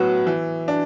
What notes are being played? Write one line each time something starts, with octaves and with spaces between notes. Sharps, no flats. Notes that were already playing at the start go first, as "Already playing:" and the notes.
Already playing: A2 F#3 B3 F#4
E3
D4